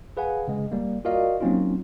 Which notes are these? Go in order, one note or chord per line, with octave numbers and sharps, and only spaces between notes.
G#4 B4 F5 F#5 G#5
C#3 G#3
G3 A#3
F4 F#4 A#4 D5 D#5 F5
F#3 A#3 C4 C#4 D#4 F4